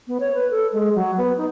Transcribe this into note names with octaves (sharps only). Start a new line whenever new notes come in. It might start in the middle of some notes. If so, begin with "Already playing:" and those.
B3
C#5
B4
A4
G#3
F#3
B3
D#4